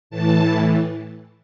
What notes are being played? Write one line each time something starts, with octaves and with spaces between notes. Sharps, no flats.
A2 E3 A5